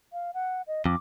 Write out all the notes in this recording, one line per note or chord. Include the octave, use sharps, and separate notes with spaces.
F5
F#5
D#5
F2 D6